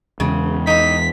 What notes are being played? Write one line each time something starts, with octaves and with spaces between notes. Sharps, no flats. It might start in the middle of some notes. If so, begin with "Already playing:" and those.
E2 C#3 G#3
E3 D#4 B6